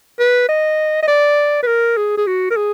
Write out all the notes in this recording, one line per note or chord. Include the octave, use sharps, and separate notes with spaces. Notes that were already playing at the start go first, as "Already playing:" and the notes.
B4
D#5
D#5
D5
B4
A#4
G#4
G#4
F#4
A#4
G#4